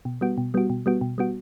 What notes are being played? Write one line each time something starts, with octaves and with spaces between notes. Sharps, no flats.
B2
G3 B3 F#4
B2
G3 B3 F#4
B2
G3 B3 F#4
B2
G3 B3 F#4